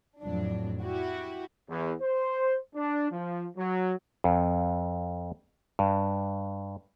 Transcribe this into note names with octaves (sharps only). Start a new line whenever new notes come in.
F2 A2 F#3 D4
E4 F#4 G4
E2
C5
D4
F3
F#3
F2
G2